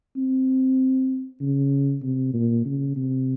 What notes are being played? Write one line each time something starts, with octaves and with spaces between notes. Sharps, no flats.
C4
C#3
C3
A#2
C#3
C3